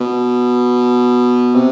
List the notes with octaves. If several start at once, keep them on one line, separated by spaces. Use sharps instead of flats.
B2
C3